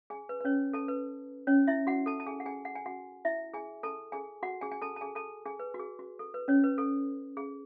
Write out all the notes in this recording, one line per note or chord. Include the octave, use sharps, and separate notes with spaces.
G#4 G#5
B4
B4
C#4 C#5
A4 A5
B4
C#4 C#5
E4 E5
F#4 F#5
A4 A5
A5
G#4 G#5
F#5
G#4 G#5
F#5
G#5
F#4 F#5
E4 E5
G#4 G#5
A4 A5
G#4 G#5
F#4 F#5
G#4 G#5
G#5
A4 A5
A5
G#4 G#5
A4 A5
G#4 G#5
B4
F#4
G#4
F#4
A4
B4
C#4 C#5
B4
A4
G#4